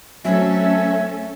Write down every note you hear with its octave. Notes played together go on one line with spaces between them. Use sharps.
F#3 A3 C4 C#4 A4 E5 G#5